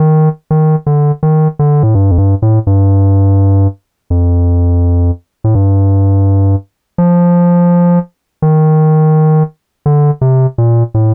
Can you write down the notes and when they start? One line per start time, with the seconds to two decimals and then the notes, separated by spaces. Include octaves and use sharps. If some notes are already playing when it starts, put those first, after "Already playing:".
Already playing: D#3
0.51 D#3
0.86 D3
1.23 D#3
1.59 D3
1.83 A2
1.95 G2
2.11 F2
2.18 G2
2.42 A2
2.67 G2
4.10 F2
5.44 A2
5.55 G2
6.98 F3
8.42 D#3
9.86 D3
10.21 C3
10.58 A#2
10.94 A2